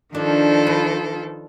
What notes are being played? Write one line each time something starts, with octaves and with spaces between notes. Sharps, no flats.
D#3 F3 D4 A4
B4